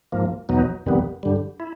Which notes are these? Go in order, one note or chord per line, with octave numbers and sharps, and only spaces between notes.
G#2 F3 A#3
E2 B2 F#3 B3 D#4
F2 C3 D#3 G3 B3
G2 D3 G3
E4